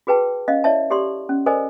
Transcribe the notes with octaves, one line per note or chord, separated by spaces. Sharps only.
F#4 G#4 B4 G5 A5
C#4 D#5 F5
E4 C#5 D5 E5 A5
G4 A4 D5 C6
C#4
A4 A#4 C5 D5 D#5 G#5